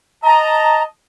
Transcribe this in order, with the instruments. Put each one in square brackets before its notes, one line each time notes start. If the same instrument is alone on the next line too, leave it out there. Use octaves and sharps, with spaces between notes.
[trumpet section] D#5 A5 [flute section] A#5